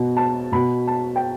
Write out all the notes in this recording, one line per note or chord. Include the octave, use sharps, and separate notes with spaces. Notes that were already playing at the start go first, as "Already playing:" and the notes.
Already playing: B2
A5
B2 B5
A5
G5